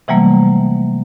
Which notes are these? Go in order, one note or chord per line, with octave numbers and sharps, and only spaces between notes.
C3 E3 F#3 G3 A3 A#3